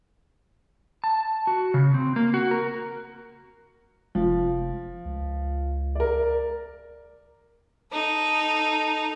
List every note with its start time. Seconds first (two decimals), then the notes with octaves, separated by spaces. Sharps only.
1.04 A5
1.47 F#4
1.74 C#3
1.94 C4
2.16 A#3
2.34 F#4
2.51 A#4
4.15 F1 F3
5.05 C#2
5.95 A#4 D5
7.92 D#4 A4